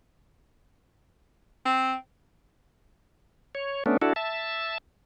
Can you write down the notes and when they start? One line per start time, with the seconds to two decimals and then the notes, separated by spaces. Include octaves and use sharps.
1.65 C4
3.55 C#5
3.86 A3 B3 C#4 D4
4.02 D4 E4 F#4 A4
4.16 E5 A5